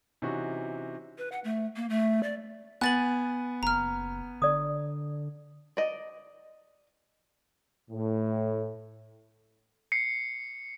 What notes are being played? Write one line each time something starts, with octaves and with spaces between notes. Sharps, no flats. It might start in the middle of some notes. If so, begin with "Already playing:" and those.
C3 E3 C#4 D#4 F#4
B4
F#5
A3
A#3
A3
D5
B3 G#5 F#6 A6 F#7
F#1 A#5 F6
D3 D5 D#6
D5 D#5
A2
C7 C#7